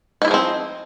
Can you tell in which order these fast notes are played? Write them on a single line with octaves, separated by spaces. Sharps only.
D#4 E4 G#4 F3 C4